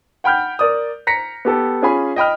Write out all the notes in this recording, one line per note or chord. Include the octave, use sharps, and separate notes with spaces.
F#5 G5 B5 F6 G6
A#4 D5 D#6
A#5 A#6 B6 C#7
B3 G4 A4
C#4 F4 G#4 C#5 G#5 B5
D#5 G5 B5 F6